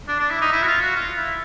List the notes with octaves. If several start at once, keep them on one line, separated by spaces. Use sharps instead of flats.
D4
D4
E4
D#4
E4
F#4
F4
F#4
F4
E4